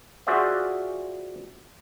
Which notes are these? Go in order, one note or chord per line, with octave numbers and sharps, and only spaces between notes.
F4 F#4 G#4 C5 D5 E5